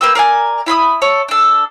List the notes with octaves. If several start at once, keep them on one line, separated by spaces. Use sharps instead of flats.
A#3 B4 G5 E6
A#4 D5 F5 G#5
E4 B5 C6 D#6
A4 C#5
D4 A4